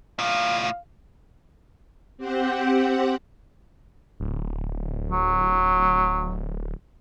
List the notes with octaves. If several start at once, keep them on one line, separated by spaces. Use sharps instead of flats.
A2 F4 F5
C4 G4 C5 F#5
D1
F#3